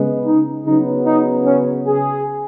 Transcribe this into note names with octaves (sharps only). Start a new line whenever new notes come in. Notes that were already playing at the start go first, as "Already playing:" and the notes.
Already playing: C#3 G#3 B3
D#4
C#3 F#3 B3 D#4
D#4
C#4
G#4